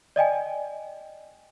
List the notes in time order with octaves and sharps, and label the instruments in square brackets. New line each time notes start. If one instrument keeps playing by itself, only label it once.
[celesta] D5 D#5 G5 G#5